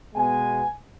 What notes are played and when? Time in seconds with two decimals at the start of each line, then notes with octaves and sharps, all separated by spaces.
0.14 B2 G#3 B3 G#5